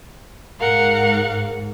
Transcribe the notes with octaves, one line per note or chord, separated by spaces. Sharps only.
G#2 A#4 F5 F#5